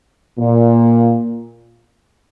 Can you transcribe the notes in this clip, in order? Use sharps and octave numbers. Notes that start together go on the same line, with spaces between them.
A#2